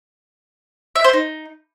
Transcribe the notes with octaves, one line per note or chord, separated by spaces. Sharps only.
E5
C5
D#4